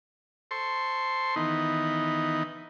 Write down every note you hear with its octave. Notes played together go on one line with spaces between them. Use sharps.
A4 C5 C6 C#6
D#3 E3 B3 D#4